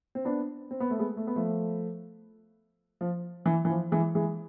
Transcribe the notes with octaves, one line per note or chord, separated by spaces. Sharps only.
C4
B3 D4
C4
B3
A3
G#3 B3
A3
B3
F3 A3
F3
E3
E3
F3
E3 G#3
E3 G#3